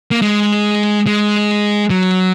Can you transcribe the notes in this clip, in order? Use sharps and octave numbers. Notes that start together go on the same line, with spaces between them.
A#3
G#3
G#3
F#3